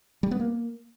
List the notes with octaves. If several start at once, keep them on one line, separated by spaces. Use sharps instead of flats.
G3
B3
A#3